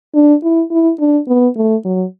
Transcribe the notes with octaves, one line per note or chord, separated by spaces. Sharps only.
D4
E4
E4
D4
B3
A3
F#3